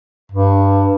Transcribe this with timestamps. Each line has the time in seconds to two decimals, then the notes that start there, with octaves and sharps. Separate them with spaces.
0.32 G2